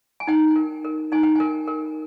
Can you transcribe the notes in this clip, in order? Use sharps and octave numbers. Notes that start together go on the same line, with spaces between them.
G#5
D#4 G5
A#4
A#4
D#4 G#5
G5
A#4 G#5
A#4